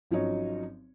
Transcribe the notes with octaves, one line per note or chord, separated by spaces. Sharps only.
G#1 F3 F#3 C#4 D#4 C#5